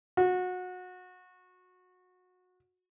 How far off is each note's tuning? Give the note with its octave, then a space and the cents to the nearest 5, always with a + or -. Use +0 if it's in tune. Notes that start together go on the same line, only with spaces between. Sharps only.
F#4 -25